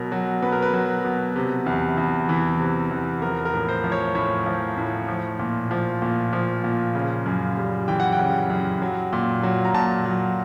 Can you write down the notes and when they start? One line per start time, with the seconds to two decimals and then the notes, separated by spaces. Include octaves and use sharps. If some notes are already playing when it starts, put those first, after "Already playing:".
Already playing: B2 F#3 A#4
0.12 F#3
0.42 B2 B4
0.52 A#4
0.62 B4
0.73 F#3
1.04 B2
1.36 C3
1.66 E2
1.98 E2
2.29 E3
2.60 C3
2.91 E2
3.22 F3 A#4
3.45 A#4
3.54 A2
3.69 C5
3.84 F3
3.92 C#5
4.15 A2 C#5
4.46 F3
4.77 A2
5.08 F3
5.39 A#2
5.71 F3
6.02 A#2
6.33 F3
6.64 A#2
6.95 C#3
7.26 F#2
7.57 G3
7.88 E3 G5
8.00 F#5
8.12 G5
8.19 C#3
8.50 F#2
8.82 F#3
9.13 A#2
9.43 F#3
9.65 A#5
9.74 A#2 A5
10.05 F#3